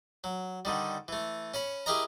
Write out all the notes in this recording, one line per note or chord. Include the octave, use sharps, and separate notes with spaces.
F#3
D3 D#3 G3
E3 A3
C#4 C#5 B5
E4 G4 G#4 A#4 D#5 A#5